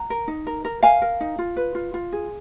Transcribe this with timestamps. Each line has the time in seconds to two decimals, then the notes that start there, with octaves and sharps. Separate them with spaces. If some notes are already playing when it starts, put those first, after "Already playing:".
Already playing: F#5 A#5
0.10 A#4
0.28 D#4
0.47 A#4
0.65 A#4
0.83 A#4 F5 G#5
1.02 A#4
1.21 D#4
1.38 F4
1.57 B4
1.75 F4
1.94 F4
2.12 G#4